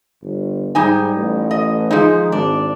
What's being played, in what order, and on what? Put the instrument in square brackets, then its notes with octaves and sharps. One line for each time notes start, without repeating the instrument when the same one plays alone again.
[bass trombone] G1
[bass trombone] G#2 [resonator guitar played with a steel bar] G3 D#4 G#5
[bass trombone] A1
[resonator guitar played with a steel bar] D#5
[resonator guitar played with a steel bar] F3 D#4 [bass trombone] G#3
[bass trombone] G#1 [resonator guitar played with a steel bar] D4